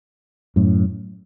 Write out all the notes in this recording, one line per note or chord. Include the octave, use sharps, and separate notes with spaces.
F#2 A2